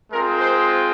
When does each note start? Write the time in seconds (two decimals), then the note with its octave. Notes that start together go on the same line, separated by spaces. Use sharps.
0.10 G#3 C4 F4 A#4
0.40 C5